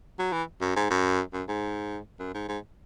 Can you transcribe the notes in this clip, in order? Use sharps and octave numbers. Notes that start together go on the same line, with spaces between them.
F#3
E3
F#2
G#2
F#2
F#2
G#2
F#2
G#2
G#2